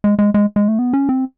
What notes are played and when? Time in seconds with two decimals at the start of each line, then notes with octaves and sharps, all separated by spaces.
0.04 G#3
0.19 G#3
0.34 G#3
0.56 G#3
0.68 A3
0.79 B3
0.93 C#4
1.09 C4